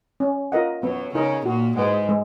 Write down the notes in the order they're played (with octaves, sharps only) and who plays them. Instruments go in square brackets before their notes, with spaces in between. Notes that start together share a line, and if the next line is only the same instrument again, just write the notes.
[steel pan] C#4
F4 A#4 D#5 F#5
[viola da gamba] F#2 F#3 [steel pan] B3
[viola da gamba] C#3 C#4 [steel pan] D#4 A#4 D#5
[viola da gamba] A#2 A#3 [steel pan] F#4
[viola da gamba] G#2 G#3 [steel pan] B4 F#5
[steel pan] G#3